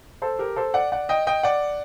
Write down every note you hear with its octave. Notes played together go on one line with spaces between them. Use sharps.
A4 C5
G4 A#4
A4 C5
D5 F#5
D5 F#5
D#5 G5
D#5 G5
D5 F#5